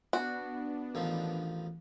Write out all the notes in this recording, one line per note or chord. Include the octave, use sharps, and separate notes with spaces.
B3 D4 F#4
A1 D#3 F3